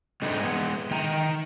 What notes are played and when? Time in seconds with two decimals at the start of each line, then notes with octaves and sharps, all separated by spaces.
0.22 D3 G#3 A3 C4 D4 D#4
0.40 G#3 B3
0.91 D#3 G5 A#5